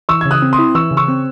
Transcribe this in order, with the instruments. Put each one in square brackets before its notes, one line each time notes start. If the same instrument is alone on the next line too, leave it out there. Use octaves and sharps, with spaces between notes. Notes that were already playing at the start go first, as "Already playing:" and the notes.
[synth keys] E3 [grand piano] C#6 E6
[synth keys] C#3 [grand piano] G#6
[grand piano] D#6 F#6
[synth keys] C4
[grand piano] C6 D#6
[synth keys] E4
[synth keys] E3 [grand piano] C#6 E6
[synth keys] C#3
[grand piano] C#6 E6
[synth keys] C4